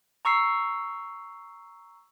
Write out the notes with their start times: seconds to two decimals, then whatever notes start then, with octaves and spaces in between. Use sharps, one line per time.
0.25 A#5 C#6 E6 C7